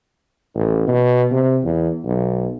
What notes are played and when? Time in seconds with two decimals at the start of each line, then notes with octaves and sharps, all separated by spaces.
0.55 A1
0.87 B2
1.31 C3
1.64 E2
2.05 B1